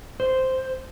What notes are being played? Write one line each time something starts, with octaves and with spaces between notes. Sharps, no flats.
C5